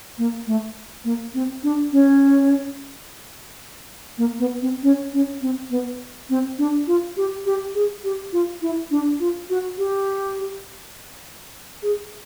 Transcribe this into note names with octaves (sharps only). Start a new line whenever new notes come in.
A#3
A3
A#3
C4
D4
C#4
A#3
B3
C4
C#4
C#4
C4
B3
C4
D4
F4
G4
G4
G#4
G4
F4
E4
D4
F4
F#4
G4
G#4